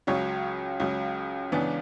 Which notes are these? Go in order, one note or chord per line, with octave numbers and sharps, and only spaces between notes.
C#2 C#3 F#3 C#5
C#2 C#3 F#3
C#2 C#3 E3 B3 D4 D5